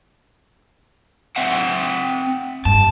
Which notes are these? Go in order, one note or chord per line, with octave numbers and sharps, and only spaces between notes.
C4 E5 F#5
G2 A5